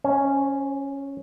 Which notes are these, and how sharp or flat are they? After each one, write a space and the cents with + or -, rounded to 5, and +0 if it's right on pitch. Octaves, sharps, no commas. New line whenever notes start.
C#4 +0 C5 +35